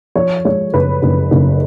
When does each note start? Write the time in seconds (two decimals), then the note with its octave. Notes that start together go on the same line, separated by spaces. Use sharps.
0.16 F3 C#5
0.45 G#3 C#5
0.73 F#1 B4
1.02 F#1
1.31 F#1